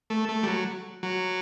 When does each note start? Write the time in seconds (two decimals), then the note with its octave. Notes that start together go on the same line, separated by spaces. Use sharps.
0.10 A3
0.29 A3
0.43 G3
0.47 F#3
1.03 F#3